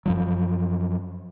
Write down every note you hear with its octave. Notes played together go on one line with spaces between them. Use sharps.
F#2 F3 F#3